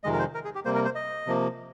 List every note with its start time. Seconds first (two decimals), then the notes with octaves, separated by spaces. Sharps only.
0.04 F2 C3 D#3 G#3 D#5
0.13 A#4
0.19 C5
0.34 A#4
0.45 G#4
0.55 G4
0.65 C3 G3 A#3 C5
0.75 A#4
0.85 C5
0.95 D#5
1.26 C3 F3 A#3